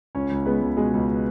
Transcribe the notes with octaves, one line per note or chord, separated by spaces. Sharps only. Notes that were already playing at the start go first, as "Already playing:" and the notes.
C#2 C#4 C#5
C#2
G#3 B3 B4
C#2
B2 G#3 G#4
C#2